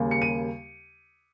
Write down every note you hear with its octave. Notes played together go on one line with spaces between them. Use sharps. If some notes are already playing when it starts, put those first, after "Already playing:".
Already playing: D#2 C#3 G3 A#3
C#7
D#7